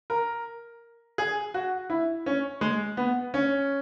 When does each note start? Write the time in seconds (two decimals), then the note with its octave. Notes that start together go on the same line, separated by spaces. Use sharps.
0.10 A#4
1.18 G#4
1.54 F#4
1.90 E4
2.26 C#4
2.61 G#3
2.97 B3
3.34 C#4